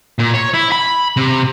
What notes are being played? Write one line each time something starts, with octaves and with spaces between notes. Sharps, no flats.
A#2
C#5
E4
B5
C3